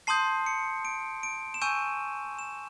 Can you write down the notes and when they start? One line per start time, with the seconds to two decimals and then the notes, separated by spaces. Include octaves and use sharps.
0.07 A5 C6 D#6 G6 C7
0.46 C#7
0.85 D7
1.23 D7
1.54 E7
1.62 G#5 C#6 E6 G6 D#7
2.39 E7